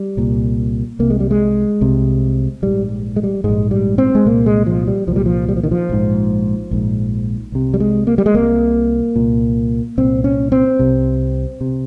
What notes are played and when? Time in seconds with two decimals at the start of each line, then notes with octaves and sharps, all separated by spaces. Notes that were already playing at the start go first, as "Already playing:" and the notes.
Already playing: G3
0.17 C2 A#2
0.99 C2 C3 A#3
1.10 G#3
1.20 G3
1.31 G#3
1.81 C2 C3
2.62 A#1 G#2 G3
3.16 G#3
3.23 G3
3.44 A#1 G#2 G#3
3.71 G3
3.98 C4
4.15 G#3
4.25 C2 A#2 A#3
4.46 G#3
4.66 F3
4.87 G3
5.07 C2 F3
5.12 A#2 G3
5.26 F3
5.49 G3
5.57 F3
5.63 D#3
5.71 F3
5.89 A#1 G#2
6.71 A#1 G#2
7.52 C2 C3
7.74 G3
7.80 G#3
8.07 A#3
8.18 G3
8.26 G#3
8.34 C2 C3 A#3
9.16 C2 A#2
9.98 C2 A#2 C4
10.24 C#4
10.52 C4
10.79 C2 C3
11.61 C3